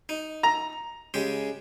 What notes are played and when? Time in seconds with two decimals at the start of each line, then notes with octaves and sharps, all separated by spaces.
0.09 D#4
0.43 A#5
1.14 C#3 G#3 G4